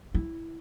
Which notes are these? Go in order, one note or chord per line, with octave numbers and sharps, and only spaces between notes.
E4